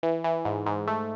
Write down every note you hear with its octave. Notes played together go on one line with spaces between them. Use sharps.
E3
E3
G#2
G#2
A3